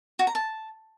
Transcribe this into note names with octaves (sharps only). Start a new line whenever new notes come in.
F#4
A#5
A5